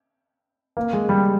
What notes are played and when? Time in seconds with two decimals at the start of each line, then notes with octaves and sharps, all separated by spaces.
0.77 A#3
0.93 G#3
1.09 G3